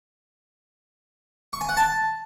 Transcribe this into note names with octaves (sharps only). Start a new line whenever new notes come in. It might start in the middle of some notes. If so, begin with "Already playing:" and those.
C#6
G#5
F#5
A5